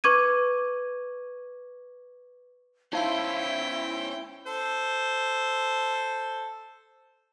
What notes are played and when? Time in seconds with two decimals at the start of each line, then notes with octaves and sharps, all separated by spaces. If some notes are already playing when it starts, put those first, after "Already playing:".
0.04 B4 C#6 D6 G#6 D#7
2.93 C#4 D#4 E4 C5 F5 G5 C6
4.47 A4 C5